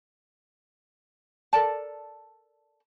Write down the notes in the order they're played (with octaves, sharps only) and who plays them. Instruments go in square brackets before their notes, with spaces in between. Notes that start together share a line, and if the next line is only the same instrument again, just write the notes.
[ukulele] A4 A#4 D5 A5